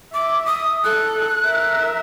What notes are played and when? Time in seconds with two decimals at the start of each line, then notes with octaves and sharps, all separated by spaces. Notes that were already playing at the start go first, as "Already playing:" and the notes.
0.14 E5 D6
0.46 D#6
0.84 A4 F#6
1.45 A#4 E5